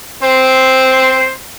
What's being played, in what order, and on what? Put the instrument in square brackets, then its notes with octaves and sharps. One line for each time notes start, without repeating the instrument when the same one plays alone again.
[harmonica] C4 C5